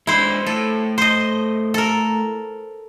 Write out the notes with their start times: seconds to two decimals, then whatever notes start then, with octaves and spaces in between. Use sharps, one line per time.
0.07 D3 G#3 E4 C5
0.46 A2 A4
0.98 C5 D#5
1.74 A4 A#4